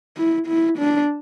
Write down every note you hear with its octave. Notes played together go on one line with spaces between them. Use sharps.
E4
E4
D4